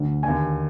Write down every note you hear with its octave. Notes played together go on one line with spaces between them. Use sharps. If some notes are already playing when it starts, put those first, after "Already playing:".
Already playing: D2 D3
D#2 D3 G#5